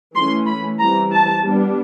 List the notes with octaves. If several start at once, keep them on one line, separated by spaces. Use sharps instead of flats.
E3 A3 C#4 C6
B5
E3 G3 C4 A#5
A5
G3 B3 D4